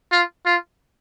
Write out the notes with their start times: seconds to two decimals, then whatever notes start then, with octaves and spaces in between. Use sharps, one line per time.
0.12 F4
0.46 F4